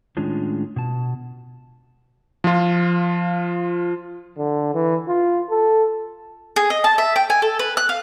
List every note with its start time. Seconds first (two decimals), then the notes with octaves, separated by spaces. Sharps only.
0.17 A2 D#3 G#3 C#4 D4 F4
0.76 B2 A5
2.44 F3 F4
4.38 D3
4.75 E3
5.08 F4
5.50 A4
6.56 G#4
6.70 D#5
6.84 A5
6.98 E5
7.16 G5
7.30 G#5
7.42 A4
7.59 B4
7.77 F#6
7.89 F5